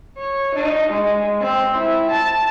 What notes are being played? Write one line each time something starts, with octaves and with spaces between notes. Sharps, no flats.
C#5
D#4
G#3
C4
E4
A5